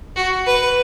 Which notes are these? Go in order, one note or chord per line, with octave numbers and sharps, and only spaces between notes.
F#4
B4